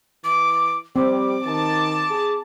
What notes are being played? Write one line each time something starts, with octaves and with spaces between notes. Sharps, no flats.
E3 D6
G3 C4 D6
D#3 A5
G#4